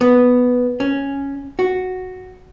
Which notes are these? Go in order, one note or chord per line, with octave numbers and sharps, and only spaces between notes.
B3
C#4
F#4